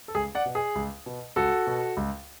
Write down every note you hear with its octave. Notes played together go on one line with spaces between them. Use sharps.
A4
C#2 G#4
D5 F#5
B2
G#4
C#2
B2
C#2 F#4 A4
B2
C#2